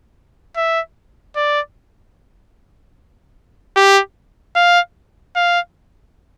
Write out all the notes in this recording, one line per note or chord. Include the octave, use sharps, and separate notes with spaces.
E5
D5
G4
F5
F5